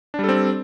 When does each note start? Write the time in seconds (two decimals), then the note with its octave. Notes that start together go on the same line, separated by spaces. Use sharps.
0.14 D4
0.19 G3
0.24 A4
0.29 C4